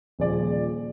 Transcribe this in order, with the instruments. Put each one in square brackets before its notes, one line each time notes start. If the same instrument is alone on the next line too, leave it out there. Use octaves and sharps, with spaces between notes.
[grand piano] D#1 F3 G#4 D5